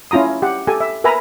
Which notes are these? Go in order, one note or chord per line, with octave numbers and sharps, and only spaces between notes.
C#4 E4 F4 A#5 D#6
G4 F#5
G4 A4 G#5
E5
A#4 B4 E5 G#5 A#5 B5